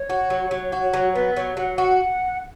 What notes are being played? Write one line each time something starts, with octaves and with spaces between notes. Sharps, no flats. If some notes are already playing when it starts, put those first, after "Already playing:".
Already playing: C#5
F#4
F#3
F#3
F#4
F#3
B3 B4
F#3 C#5
F#3 F#5
F#4 F#5